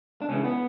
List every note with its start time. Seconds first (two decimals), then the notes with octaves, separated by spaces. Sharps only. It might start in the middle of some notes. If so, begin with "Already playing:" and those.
0.22 D4
0.29 C#2 C#3 E3 C#4
0.44 B3